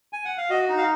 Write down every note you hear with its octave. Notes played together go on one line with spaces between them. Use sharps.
G#5
F#5
F5
F#4 D#5
D#4
F5